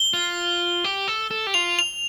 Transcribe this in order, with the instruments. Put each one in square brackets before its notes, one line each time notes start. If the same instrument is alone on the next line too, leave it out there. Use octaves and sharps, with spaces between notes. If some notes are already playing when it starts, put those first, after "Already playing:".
Already playing: [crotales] G7
[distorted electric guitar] F4
G4
A4
A4
G4
[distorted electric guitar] F4 [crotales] F7
[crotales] F7